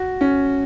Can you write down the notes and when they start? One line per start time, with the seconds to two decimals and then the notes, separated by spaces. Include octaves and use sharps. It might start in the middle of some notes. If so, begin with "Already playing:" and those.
Already playing: F#4
0.21 C#4